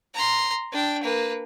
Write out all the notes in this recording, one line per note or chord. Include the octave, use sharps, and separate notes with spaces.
A#5 C6
D4 G5
A#3 B4